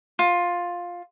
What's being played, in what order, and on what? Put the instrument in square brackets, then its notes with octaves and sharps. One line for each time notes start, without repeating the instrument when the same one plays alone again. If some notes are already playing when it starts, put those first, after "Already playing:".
[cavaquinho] F4